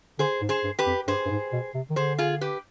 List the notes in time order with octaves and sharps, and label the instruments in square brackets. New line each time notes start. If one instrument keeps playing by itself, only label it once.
[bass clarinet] D3 [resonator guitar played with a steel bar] G#4 C5
[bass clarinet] G#2
[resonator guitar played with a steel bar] G#4 C5
[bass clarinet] G2
[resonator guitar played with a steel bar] G4 B4
[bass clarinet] F2
[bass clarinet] G2 [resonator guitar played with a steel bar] G#4 C5
[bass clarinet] G2
G#2
B2
C3
D#3
[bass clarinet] D3 [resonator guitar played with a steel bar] G#4 C5
[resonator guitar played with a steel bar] F4 G#4
G4 B4